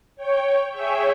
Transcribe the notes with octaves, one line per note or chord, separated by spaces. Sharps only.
C#5 G5
G#4 C#5 E5 G5